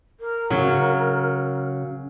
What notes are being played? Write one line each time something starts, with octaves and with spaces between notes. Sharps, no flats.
A#4
C#3 F#3